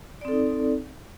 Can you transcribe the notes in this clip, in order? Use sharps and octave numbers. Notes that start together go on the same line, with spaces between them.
C4 D#4 A4 D5